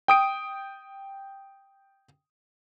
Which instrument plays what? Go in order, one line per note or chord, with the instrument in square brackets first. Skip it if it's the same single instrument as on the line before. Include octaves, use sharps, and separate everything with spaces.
[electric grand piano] G5 D#6 D7